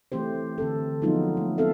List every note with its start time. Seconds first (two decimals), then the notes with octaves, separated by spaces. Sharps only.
0.12 E3 A3 C4 G4 C5
0.58 D3 C4 A4
1.02 F3 F#3 G#3 B3 D#4 F4
1.37 A3
1.58 B3 C4 A4 E5 F5